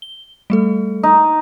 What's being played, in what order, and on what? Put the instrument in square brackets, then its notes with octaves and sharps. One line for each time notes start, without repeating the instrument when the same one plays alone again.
[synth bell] G7
G3 A3 A4
[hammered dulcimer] D#4